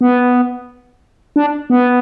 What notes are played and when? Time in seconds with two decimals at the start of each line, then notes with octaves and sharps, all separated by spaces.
0.01 B3
1.36 D4
1.70 B3